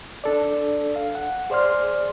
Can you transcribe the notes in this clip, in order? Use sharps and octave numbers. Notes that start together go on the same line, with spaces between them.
D4 A4 D5
F5
F#5
G#4 C5 D5 C6 F6